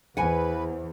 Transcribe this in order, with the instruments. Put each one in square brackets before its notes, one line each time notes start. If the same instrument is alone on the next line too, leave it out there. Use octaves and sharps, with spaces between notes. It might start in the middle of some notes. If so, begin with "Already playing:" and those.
[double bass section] E2 [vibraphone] E4 C5 [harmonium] B4 [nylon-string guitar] F#5 G#5